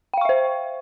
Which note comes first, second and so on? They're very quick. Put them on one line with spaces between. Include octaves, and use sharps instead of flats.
G5 F5 C#6 E5 C5